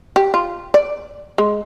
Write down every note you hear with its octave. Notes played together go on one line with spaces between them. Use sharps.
G4
F4
D5
G#3